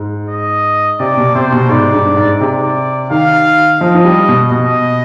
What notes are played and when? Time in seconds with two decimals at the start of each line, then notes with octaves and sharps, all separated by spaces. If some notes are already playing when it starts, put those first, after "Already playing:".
Already playing: G#2
0.29 D#5
1.00 C3 D5
1.17 B2
1.35 C3 C5
1.52 B2
1.69 G#2 D5
1.94 G2
2.17 G#2
2.41 C3 D5
3.11 D#3 F5
3.81 F3 D#5
3.95 F3
4.04 G3
4.28 B2
4.51 B2 D#5